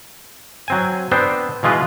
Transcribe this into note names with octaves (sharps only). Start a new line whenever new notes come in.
F#3 C4 G#5
B3 C4 D4 C5
B2 E3 G#3 F4 B4